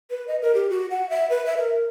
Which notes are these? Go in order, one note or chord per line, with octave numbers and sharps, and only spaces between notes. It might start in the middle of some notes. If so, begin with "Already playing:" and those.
B4
D#5
A#4
G4
F#4
F#5
E5
B4
E5
A#4